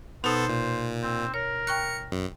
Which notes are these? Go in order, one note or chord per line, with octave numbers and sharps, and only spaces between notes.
B2 B3 D#4 A4 C5
A#2
C4
A#4 C#5
G5 C#6 F#6 C#7
F#2